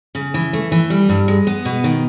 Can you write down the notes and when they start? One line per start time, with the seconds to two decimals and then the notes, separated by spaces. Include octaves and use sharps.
0.15 C#3
0.34 E3
0.53 A3
0.72 E3
0.90 G3
1.09 G2
1.28 G#3
1.47 B3
1.65 B2
1.84 D#3